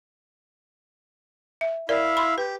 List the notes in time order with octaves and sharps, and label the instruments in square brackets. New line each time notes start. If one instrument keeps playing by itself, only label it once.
[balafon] E5
[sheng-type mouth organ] E4 E5 F5 [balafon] A#4 D5
[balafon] B5 C6
[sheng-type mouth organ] G4 [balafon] B4